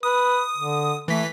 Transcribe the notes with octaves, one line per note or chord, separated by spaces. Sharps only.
B4 D#6
D3
E3 A3 B6